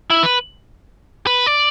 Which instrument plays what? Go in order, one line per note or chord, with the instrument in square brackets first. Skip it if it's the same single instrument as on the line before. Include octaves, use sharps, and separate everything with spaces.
[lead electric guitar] E4
B4
B4
D5